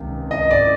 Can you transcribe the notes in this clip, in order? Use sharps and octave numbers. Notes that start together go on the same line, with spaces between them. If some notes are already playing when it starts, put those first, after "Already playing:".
Already playing: C#2 C3 D#3
D#5
D5